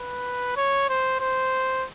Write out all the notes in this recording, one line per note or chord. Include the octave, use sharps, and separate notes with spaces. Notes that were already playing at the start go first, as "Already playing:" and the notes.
Already playing: B4
C#5
C5
C5